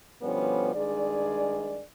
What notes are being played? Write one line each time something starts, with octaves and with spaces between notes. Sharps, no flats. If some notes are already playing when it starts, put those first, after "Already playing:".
B2 D3 F3 G3 B3 C#4
G2 D#3 G#3 G#4 D5